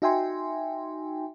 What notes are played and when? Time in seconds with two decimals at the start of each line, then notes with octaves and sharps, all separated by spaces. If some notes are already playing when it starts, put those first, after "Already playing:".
0.02 D#4 F#4 E5 G5 G#5 C6